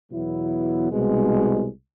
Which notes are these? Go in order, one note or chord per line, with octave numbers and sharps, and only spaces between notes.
E2 B2 F#3 B3 E4
C2 B2 G#3